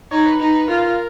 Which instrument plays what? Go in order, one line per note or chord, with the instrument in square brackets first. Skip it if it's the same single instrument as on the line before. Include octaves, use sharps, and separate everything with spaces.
[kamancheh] D#4 [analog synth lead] C#5
[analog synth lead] B4
[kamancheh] D#4
[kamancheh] F4 [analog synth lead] A#4